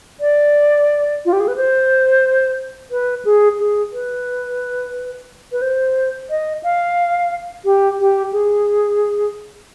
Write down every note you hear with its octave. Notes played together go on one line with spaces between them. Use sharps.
D5
F4
G4
G#4
B4
C5
B4
G#4
G#4
B4
B4
C5
D#5
F5
G4
G4
G#4